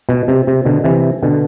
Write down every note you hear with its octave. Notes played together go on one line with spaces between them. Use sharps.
B2
C3
C3
B2 D3
C3 E3
B2 D3